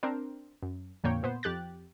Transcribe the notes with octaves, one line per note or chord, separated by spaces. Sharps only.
C4 D4 A#4 C5
F#2
F2 A#2 D3 A#3 C#5 G5
A#2 B3 C5
F2 G4 F#6 A6